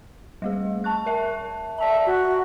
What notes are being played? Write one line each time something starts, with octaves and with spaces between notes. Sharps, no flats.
G3 A3 G#4
A5 C#6 F#6
A#4 E5 A5
D5 E5 A5 A#5
F#4